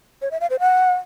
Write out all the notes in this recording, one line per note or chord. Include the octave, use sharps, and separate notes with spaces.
C#5
E5
F5
C5
F#5